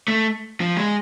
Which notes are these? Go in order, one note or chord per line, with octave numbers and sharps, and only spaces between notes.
A3
F3
G#3